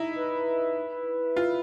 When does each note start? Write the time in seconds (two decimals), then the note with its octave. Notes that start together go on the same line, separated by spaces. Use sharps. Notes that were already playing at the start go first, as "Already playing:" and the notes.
Already playing: D#4 E4
0.16 B4
1.36 F4